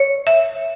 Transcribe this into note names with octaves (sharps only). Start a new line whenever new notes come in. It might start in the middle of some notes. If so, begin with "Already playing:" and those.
Already playing: C#5
E5